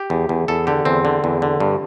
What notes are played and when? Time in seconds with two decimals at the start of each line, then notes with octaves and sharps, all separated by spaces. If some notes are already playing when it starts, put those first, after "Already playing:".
Already playing: G4
0.10 E2
0.29 E2
0.48 E2 A4
0.67 D3 G4
0.85 E2 C4
1.05 D3
1.24 E2
1.42 D3
1.60 G2